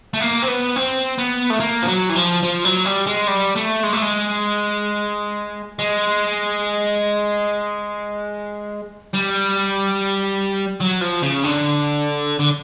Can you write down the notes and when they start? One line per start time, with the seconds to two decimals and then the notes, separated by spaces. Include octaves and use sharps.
0.14 A3
0.20 A#3
0.42 C4
0.48 B3
0.76 C4
1.18 B3
1.51 A3
1.60 A#3
1.83 F3
1.88 F#3
2.09 E3
2.16 F3
2.43 F3
2.65 F#3
2.85 G3
3.06 G#3
3.27 G3
3.56 A3
3.83 G#3
3.93 A3
4.02 G#3
5.79 G#3
9.14 G3
10.81 F#3
11.02 F3
11.23 C#3
11.44 D3
12.40 D3